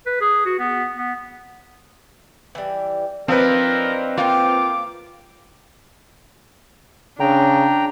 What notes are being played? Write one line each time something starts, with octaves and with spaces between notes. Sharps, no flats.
B4
G#4
F#4
B3
B3
E3 G3
F3 C4 D4 D#4 A#4 B4
A#3 F4 A4 G5 D6
C#3 D4 G5 A#5